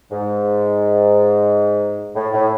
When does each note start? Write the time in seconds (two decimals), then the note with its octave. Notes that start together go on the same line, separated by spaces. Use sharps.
0.11 G#2
2.15 A2
2.33 A2